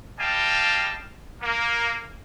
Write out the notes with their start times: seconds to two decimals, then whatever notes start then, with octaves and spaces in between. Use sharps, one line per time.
0.19 G3 D#5 F5 G5 A5
1.41 A#3